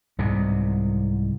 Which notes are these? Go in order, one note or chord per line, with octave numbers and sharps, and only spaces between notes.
C2 G#2 C3